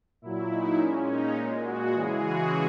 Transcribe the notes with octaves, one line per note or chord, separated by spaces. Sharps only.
A#2 F#3 E4
D#4
A#2 G#3 C#4
D#4
A#2 G#3
F#4
C#3 E3 G#3 G#4
F#4